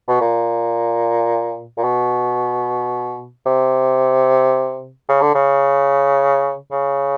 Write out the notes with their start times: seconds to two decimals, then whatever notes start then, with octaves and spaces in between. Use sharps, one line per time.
0.08 B2
0.20 A#2
1.77 A#2
1.83 B2
3.46 C3
5.09 C#3
5.21 D3
5.34 C#3
6.71 C#3